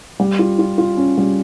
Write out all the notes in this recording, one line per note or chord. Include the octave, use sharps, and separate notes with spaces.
G3
F4
F4
F4
C#4
G3